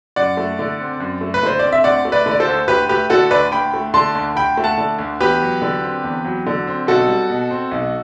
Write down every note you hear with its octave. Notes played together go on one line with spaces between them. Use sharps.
F#2 D5 F#5
A3
D3
C4
F#2
A3
B4
D3 C5
C4 D5
E5
D2 D5 F#5
A3
B4 D5
D3
D5
A4 C5
D2
D2 G4 B4
A3 G4 B4
D3 F#4 A4
D2 B4 D5
D2 G5 B5
A3
D3 A5 C6
D2
D2 G5 B5
A3
F#5 A5
D3
D2
E2 G4 B4
F#3
D3
C4
E2
F#3
D3
C4
B1 F#4 A4
G3
B2
C4
B1